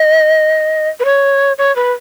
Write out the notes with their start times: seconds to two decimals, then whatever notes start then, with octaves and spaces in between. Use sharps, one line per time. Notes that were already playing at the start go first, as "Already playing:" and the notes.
Already playing: D#5
1.00 B4
1.05 C#5
1.58 C#5
1.76 B4